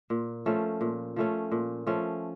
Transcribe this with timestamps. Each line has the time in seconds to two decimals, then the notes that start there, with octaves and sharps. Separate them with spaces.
0.10 A#2
0.46 F3 A3 C#4
0.81 A#2
1.16 F3 A3 C#4
1.52 A#2
1.87 F3 A3 C#4